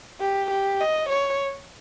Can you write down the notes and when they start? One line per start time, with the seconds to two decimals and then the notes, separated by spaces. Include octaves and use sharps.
0.21 G4
0.51 G4
0.80 D#5
1.09 C#5